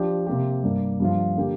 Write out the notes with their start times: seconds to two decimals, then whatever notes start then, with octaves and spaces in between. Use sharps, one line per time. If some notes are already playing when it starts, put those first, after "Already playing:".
Already playing: F3 D4 G4
0.27 C3 A#3 G4
0.63 G2 G3 A#3
1.00 G2 F3 A#3 F4
1.37 D3 A#3 G4